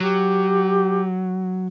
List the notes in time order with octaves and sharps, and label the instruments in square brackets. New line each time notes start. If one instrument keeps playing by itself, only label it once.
[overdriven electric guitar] F#3 [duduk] G4